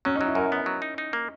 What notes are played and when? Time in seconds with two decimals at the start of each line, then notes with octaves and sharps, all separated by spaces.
0.05 F#3 C#4
0.16 D#4
0.21 F#3
0.26 E4
0.35 F#2 A#4
0.52 B3
0.66 F#3
0.82 D#4
0.98 D#4
1.13 A#3